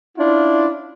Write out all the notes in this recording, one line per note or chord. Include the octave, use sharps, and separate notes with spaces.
C#4 D4 E4 F4